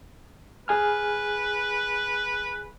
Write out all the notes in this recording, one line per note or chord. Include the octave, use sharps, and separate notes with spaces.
G#4 B4 G#5 F6